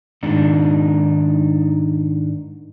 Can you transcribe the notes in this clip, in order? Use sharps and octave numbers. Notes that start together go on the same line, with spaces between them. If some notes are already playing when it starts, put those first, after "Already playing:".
G#2 D#3 D4 D#4